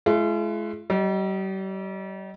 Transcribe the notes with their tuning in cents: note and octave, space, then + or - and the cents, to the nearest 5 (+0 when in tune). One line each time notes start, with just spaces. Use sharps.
G#3 +40 F4 -45
G3 -40 D#5 +0